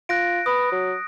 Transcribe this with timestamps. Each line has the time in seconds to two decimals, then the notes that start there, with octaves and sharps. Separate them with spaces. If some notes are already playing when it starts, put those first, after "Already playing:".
0.09 F4 F#6 A#6 D7
0.46 B4 D#6
0.72 F#3